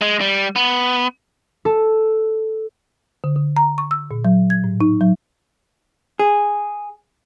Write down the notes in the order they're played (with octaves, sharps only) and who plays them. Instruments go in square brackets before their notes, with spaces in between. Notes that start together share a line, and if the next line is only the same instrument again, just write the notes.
[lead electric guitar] G#3
G3
B3
[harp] A4
[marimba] D3
D3
A#5
C#6
E6
A#2
F#3
G#6
A2
D#4
F#3
[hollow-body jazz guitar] G#4